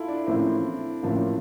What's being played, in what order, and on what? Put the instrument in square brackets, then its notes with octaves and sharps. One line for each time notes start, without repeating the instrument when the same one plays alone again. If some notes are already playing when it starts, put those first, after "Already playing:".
Already playing: [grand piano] E4 F4 A4
D4
[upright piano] A1 A2 F3 A#3 E4 [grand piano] C4
[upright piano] A1 A2 F3 A#3 E4